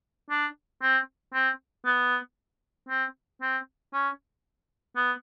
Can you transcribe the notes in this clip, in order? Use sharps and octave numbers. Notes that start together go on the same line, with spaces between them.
D4
C4
C4
B3
C4
C4
C#4
B3